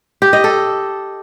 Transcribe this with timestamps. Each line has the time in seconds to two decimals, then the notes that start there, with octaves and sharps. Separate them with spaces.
0.22 G4
0.33 D#5
0.44 A4